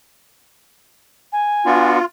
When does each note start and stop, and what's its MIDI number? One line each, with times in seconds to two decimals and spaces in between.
1.33 1.89 80
1.66 1.99 59
1.66 1.99 62
1.66 2.05 65
1.66 1.99 66